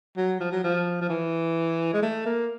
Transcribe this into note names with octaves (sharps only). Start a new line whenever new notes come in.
F#3
F3
F#3
F3
F3
E3
G#3
A3
A#3